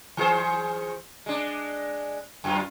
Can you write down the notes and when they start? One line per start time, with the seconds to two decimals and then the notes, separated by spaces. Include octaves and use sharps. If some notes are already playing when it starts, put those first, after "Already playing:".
0.17 E3 G#4 C5
1.26 G#3 D4
2.44 F#2 F4